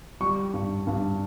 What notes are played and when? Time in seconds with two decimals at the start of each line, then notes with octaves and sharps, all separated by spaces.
0.21 G3 C#6
0.54 G2
0.87 G2